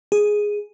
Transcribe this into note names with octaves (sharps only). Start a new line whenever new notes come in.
G#4